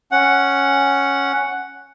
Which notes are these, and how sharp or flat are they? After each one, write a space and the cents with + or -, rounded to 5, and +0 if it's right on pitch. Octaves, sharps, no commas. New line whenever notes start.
C#4 +0 F#5 +0